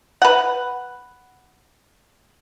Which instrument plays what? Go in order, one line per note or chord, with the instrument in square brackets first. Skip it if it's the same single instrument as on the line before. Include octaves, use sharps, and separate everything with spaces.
[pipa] B4 F#5